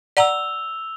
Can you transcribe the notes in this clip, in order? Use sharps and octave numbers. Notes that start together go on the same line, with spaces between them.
D5 F#5 A#5 E6 F7 G7